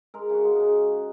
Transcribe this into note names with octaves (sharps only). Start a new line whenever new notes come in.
G#3 A#4
C#3 F#4
G#3
C#3 D#4